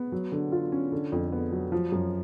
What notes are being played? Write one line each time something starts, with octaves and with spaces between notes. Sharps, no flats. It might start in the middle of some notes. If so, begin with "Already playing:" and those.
Already playing: B3
F#3
D3
F4
C#4
D3
F2
B3
F#3
F3
F#2